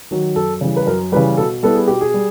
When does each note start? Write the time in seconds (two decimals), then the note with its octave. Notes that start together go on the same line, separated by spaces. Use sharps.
0.11 D#3 F#3
0.35 F#2 A4
0.61 C#3 E3 G3
0.76 B4
0.87 F#2 A#4
1.12 C#3 E3 G3 B4
1.37 B2 A4
1.63 G3 B3 E4 A4
1.75 G#4
1.88 B2 G4
2.01 G#4
2.14 G3